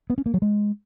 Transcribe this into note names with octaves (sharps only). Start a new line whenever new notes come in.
B3
C#4
A#3
F#3
G#3